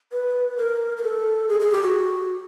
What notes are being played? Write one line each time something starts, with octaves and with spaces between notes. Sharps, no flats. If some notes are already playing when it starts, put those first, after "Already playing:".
B4
A#4
A#4
A4
G#4
G#4
G4
F#4